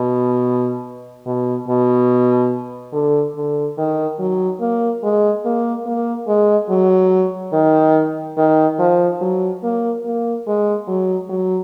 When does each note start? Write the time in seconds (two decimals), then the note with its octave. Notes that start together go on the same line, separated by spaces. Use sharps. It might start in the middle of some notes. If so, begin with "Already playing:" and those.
Already playing: B2
1.26 B2
1.68 B2
2.93 D3
3.36 D3
3.78 D#3
4.19 F#3
4.60 A#3
5.03 G#3
5.45 A#3
5.86 A#3
6.28 G#3
6.69 F#3
7.53 D#3
8.38 D#3
8.79 F3
9.21 F#3
9.63 A#3
10.05 A#3
10.47 G#3
10.88 F#3
11.30 F#3